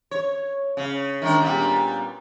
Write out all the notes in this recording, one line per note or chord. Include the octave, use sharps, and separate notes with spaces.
C#5
C#3
D#3 G#3 D4
A#2 G3 B3